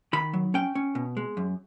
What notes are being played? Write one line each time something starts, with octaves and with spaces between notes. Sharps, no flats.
D#3 B5
F#3
C#4 G5
C#4
B2
G#3
F#2